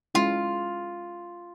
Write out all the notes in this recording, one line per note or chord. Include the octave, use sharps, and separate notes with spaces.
G#3 C#4 E4 F4